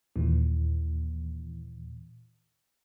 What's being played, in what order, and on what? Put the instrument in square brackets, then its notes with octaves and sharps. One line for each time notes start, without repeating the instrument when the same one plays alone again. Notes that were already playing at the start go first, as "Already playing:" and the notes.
[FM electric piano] D#2 A#2 E3